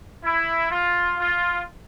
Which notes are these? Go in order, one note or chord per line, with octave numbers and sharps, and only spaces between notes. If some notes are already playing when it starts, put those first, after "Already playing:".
E4
F4
F4